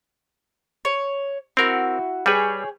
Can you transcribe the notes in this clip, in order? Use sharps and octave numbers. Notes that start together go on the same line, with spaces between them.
C#5
C4 E4 F#4 A#4
G3 G#4 B4 C#5 G5